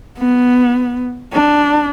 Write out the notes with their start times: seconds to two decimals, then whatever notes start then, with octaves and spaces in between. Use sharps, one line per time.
0.19 B3
1.33 D4